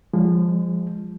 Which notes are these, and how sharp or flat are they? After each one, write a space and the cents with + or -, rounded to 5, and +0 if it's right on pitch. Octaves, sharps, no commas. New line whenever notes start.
F3 +0 G#3 -30